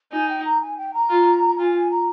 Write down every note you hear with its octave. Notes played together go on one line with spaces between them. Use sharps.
D#4 G#5
G5
A#5
G#5
G5
A#5
F4
F4 G#5
G#5
A#5